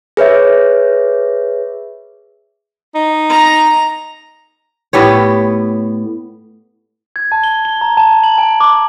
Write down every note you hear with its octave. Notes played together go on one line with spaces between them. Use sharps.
G#4 B4 C#5 E5
D#4
A#5
A2 B3 G4 C#5
G#6
A5
G7
G7
A#5
A5
F#7
G#5
D6